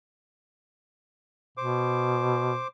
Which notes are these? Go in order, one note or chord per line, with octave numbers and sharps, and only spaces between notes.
B2 C5 D6